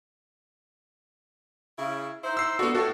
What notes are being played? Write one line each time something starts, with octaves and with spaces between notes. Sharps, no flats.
C#3 E4
D#4 E4 C5
E6 C7
B3 D4 F#4 A4
A2 F#4 A4